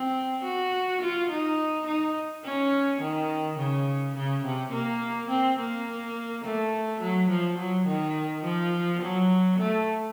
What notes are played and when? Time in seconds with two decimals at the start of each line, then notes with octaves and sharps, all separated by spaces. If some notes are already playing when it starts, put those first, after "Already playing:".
Already playing: C4
0.44 F#4
1.02 F4
1.30 D#4
1.87 D#4
2.45 C#4
3.01 D#3
3.59 C#3
4.16 C#3
4.44 C3
4.73 A#3
5.30 C4
5.59 A#3
6.45 A3
7.01 F#3
7.30 F3
7.58 F#3
7.86 D#3
8.44 F3
9.02 F#3
9.59 A3